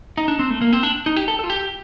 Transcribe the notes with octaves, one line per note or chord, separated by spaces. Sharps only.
D#4
D4
C4
A3
A#3
C4
D4
D#4
G4
A4
A4
F4
G4